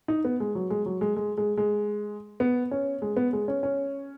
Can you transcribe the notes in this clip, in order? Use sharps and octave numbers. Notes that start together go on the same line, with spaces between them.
D#4
B3
G#3
F#3
G#3
F#3
G#3
G#3
G#3
G#3
B3
C#4
G#3
B3
G#3
C#4
C#4